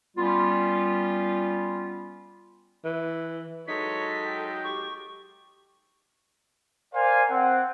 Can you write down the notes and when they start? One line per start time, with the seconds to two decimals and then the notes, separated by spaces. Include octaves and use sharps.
0.16 G3 B3 C#4 F4
2.85 E3
3.68 F#3 G#3 D#4 A4 C#5 B6
4.23 G5
4.64 G4 C#6
6.94 A#4 C5 D5 F5 G#5
7.30 C4 F#5